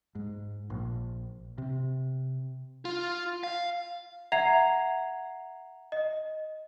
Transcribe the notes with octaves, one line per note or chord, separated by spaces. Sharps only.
G#2
A#1
C3
F4
F5
E5 F#5 A#5 G#6 C7 F7
D#5